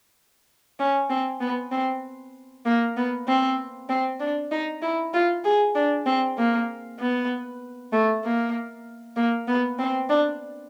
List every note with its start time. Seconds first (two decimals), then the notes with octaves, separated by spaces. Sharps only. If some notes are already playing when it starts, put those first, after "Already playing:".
0.80 C#4
1.10 C4
1.41 B3
1.72 C4
2.65 A#3
2.97 B3
3.28 C4
3.89 C4
4.20 D4
4.52 D#4
4.82 E4
5.13 F4
5.44 G#4
5.75 D4
6.06 C4
6.37 A#3
6.99 B3
7.92 A3
8.24 A#3
9.16 A#3
9.48 B3
9.79 C4
10.09 D4